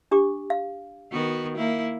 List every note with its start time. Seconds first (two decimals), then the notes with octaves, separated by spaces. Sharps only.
0.11 D4 G4 D6
0.50 F5
1.12 D#3 B3 F#4
1.57 A#3 E4